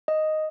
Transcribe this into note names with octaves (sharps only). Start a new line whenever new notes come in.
D#5